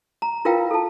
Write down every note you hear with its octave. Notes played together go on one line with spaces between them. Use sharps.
A#5
E4 F4 A#4 B4 F5 G5
A4 A5